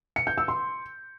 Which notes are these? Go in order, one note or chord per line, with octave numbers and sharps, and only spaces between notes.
C#7
G6
E6
C6